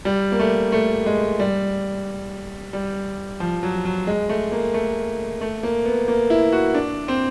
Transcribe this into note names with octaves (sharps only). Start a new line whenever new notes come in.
G3
A#3
A3
A3
G#3
G3
G3
F3
F#3
F#3
G#3
A3
A#3
A3
A3
A#3
B3
A#3
E4
F#4
D4
C4